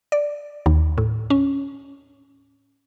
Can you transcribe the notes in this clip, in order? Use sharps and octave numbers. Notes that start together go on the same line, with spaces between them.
D5
D#2
A2
C#4